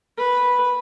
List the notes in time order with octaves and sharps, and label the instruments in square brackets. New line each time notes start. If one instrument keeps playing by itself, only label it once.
[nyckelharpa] B4